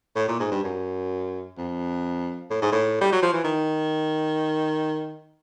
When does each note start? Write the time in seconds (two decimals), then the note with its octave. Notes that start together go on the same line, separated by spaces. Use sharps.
0.16 A2
0.29 A#2
0.40 G#2
0.52 G2
0.64 F#2
1.58 F2
2.51 A2
2.62 G#2
2.72 A2
3.01 G3
3.12 F#3
3.23 F3
3.33 E3
3.44 D#3